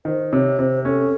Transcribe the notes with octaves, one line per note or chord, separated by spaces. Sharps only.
D#3 C5
C3 C#5
C3 C5
C#4 A4